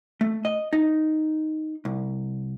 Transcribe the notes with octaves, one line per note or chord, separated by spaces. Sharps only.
A3
D#5
D#4
C2